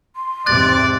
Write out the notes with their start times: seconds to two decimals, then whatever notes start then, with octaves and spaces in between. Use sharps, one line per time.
0.16 C6
0.46 E2 G#2 C3 D5 F#6 A6